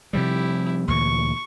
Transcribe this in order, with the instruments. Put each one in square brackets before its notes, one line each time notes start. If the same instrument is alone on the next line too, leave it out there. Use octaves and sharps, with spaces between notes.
[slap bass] C3 F3 G3 [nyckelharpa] E4 G4
[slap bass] D2 A#2 E3 [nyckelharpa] C#6